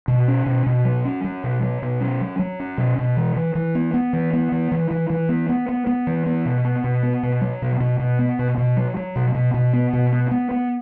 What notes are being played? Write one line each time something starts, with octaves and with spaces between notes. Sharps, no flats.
B2
C#4
B2
B2
F#3
C#4
F#3
B2
F#3
B2
C#4
F#3
F#3
C#4
B2
B2
E3
E3
E3
B3
B3
E3
B3
E3
E3
E3
E3
B3
B3
B3
B3
E3
B3
B2
B3
B2
B3
B2
F#3
B2
B2
B2
B3
B2
B2
F#3
F#3
B2
B2
B2
B3
B2
B3
B3
B3